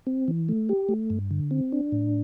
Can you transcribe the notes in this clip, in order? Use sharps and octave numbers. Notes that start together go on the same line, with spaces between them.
C4
E3
A3
G4
A3
G2
D3
C4
D4
A2